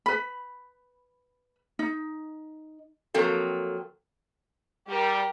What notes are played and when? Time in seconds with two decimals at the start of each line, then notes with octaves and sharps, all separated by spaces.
0.06 B4 B5
1.79 D#4
3.14 F3 F#3 A#3 C4 A4
4.87 G3 G4 A#4